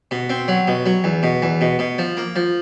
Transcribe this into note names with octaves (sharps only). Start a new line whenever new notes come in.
B2
C4
F#3
B2
F#3
E2
B2
E2
B2
B2
F3
A#3
F3